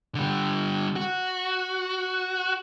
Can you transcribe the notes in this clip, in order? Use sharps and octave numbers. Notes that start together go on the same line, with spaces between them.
D3 G3
F#4